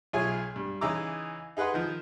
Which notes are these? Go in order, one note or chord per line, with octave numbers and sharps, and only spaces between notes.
B1 F4 G#4 C#5 E5 G#5
G2
C#3 E3 D#4 A#5 D6 E6
D#4 G#4 B4 F#5 C6
D#3 F3